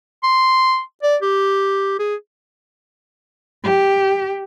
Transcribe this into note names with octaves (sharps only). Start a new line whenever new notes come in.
C6
D5
G4
G#4
G4